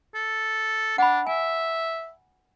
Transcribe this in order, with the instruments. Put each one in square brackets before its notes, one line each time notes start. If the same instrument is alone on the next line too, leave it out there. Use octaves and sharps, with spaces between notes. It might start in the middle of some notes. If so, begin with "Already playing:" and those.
[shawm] A4
[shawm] D4 [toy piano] F#5 B5
[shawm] E5 [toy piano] G#5